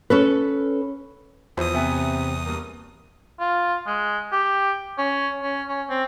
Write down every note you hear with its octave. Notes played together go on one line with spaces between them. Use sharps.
C#4 A4 B4
E2 E3 F3 C5 D#6
C3 B3 E5 G#5
G2 A#3
F4
G#3
G4
C#4
C#4
C#4
C4